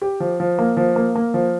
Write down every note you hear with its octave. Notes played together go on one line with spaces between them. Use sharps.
G4
F3
F3
A#3
F3
A#3
A#3
F3